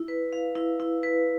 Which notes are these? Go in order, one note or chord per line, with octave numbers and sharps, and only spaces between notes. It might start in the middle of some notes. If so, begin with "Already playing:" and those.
Already playing: E4
B4
F5
E4
E4
B4